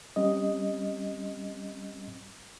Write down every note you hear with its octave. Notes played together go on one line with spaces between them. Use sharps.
G3 C4 C#4 D#5